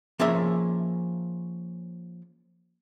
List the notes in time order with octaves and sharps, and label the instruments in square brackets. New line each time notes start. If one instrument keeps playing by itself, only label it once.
[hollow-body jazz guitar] F3 A#3 C#4 G#4 E5